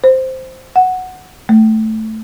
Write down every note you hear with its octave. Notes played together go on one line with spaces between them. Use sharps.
C5
F#5
A3